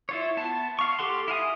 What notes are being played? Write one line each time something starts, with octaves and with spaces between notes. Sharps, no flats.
E4 F4 C#5
B3 A5
F5 C#6
G4 A4 F#5 C6
E4 F5 G#5 D#6